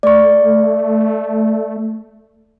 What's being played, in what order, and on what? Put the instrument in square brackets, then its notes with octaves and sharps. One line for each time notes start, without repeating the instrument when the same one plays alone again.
[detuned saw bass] A3 [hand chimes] D5 C#6